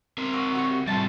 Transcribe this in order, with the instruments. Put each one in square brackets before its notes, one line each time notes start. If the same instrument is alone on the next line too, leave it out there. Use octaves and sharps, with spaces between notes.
[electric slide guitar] C4 A#4
[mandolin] A#3 F#4 E6
F#4 G4 C#6
[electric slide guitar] G3 C4 F4 [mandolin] E4 G5 A5